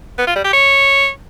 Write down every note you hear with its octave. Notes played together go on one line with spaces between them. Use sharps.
B3
F4
G3
G4
C#5